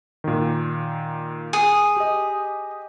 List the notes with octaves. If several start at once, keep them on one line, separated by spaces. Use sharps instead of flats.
A#2 D#3
G#4
G4 D#5